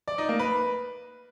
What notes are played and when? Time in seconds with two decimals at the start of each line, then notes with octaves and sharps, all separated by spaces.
0.08 D5
0.18 D#4
0.29 A#3
0.39 B4